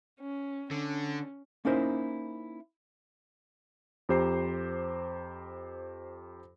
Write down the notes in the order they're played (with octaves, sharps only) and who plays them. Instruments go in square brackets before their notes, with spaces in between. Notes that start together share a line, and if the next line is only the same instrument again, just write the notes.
[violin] C#4
[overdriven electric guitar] D3 [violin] C#4
[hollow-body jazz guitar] A#3 C#4 D#4 E4 A#4 C5
[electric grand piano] F2 G4 C5 A#5 C7